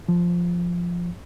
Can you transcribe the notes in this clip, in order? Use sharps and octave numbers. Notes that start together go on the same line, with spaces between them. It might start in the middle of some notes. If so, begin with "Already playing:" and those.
F3